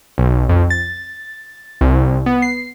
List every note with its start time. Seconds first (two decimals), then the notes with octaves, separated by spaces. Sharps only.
0.18 B1
0.49 F2
0.70 A6
1.81 C2
2.26 B3
2.42 C7